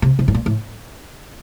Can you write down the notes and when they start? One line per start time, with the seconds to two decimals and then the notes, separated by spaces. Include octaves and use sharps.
0.02 C3
0.19 C3
0.28 A2
0.35 A#2
0.46 A2